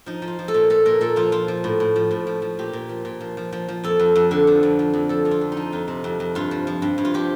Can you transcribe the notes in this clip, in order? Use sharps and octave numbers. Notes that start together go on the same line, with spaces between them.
F3 D#4
F3
F4
F3
A4
A#2
A#2 A4
A#2 A#4
A#2 A4
F3 F4
F3 F4
F3
A2
A2
F3
A2
F3
F3
A#2 G4
A#2
F3
A#2
F3
F3
F3
F3
F2 A4
F2
F2
D3
F3
F2
F3
F2
F3 A4
F2
F4
F2
D#4
F3
F2 F4
C3
F2
F2
G2 F4
F3
F3
G2
G2
F4
F3 G4